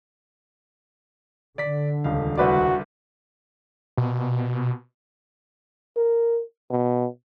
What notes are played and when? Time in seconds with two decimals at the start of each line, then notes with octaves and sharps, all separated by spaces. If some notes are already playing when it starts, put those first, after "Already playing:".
1.58 D3 D5 B6
2.04 D#1 C#2 F5
2.37 C2 F#4 B4 D5
3.98 B2
5.97 A#4
6.70 B2